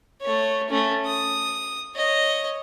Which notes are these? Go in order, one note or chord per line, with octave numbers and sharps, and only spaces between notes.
A3 C#5
A3 C#4
D#6
C#5 D#5